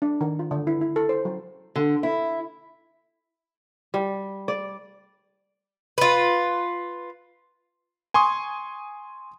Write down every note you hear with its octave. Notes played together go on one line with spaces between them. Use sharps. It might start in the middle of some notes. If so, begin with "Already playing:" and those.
D4
D#3
F4
D3
E4
E4
A4
C5
F#3
D3
E4
G3
D5
F4 B4
G#5 C6 C#6 D#6